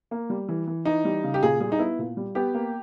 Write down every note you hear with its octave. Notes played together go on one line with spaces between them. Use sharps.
A#3
G3
E3
E3
E3 D#4
G3
C#3
G4
A#2 G#4
G3 G#4
D#4
B3 E4
A#2
G3
B3 G4
A#3